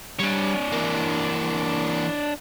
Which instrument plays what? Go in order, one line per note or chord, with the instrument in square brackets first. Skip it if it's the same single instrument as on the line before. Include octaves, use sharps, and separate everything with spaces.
[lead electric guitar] G3 [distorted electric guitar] D4 C#5
[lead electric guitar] E3 A#3